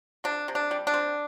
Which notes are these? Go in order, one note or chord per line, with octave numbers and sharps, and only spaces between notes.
C3 D4
C3
D4
G3
D4
C4